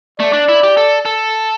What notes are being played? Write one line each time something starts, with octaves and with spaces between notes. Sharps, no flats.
A3 D5
D4
E4
G4
A4
A4